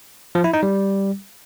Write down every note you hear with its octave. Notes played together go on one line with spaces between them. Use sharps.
F3
E4
D#4
G3